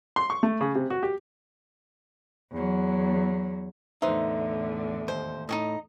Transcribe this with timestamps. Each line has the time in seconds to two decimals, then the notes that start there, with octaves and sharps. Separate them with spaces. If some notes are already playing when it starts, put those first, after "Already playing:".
0.16 C6
0.30 C#6
0.43 A3
0.61 C#3
0.75 C3
0.90 F#4
1.03 G4
2.52 E2 F#3
4.02 E2 A2 D3 D#4 B4 C5 E5
5.08 D#2 C5
5.49 A2 D#4 F#4 D#5